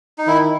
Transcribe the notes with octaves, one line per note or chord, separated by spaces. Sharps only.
D#4
D#3 E4